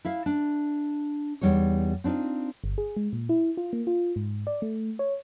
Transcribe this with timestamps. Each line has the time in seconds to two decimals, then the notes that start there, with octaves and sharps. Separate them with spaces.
0.05 E4 E5 F5
0.26 D4
1.41 E2 B2 G3 D#4 C#5
2.04 C4 D4 D#4 F4
2.64 G1
2.78 G#4
2.97 G#3
3.13 A#2
3.29 E4
3.57 F4
3.73 A#3
3.87 F4
4.16 G#2
4.47 D5
4.62 A3
4.99 C#5